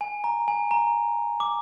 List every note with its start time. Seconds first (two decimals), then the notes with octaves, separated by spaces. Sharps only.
0.01 G#5
0.24 A#5
0.48 G#5
0.71 A#5
1.40 D6